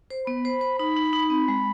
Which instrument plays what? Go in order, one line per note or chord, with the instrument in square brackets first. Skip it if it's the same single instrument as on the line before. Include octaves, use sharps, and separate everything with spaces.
[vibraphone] C5
[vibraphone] B3 [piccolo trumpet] B5
[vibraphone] C5
C5
[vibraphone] D#4 [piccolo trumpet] B5
[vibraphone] D#4
D#4
[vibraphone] C4 [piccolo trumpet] B5
[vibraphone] G#3